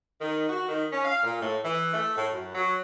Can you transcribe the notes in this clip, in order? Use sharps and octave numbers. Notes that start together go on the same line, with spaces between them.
D#3
F#4
D#3
C#4
F5
A#2
A2
E3
A3
A2
F#2
F#3